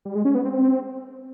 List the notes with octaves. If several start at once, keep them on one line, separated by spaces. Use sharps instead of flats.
G3
G#3
C#4
B3
C4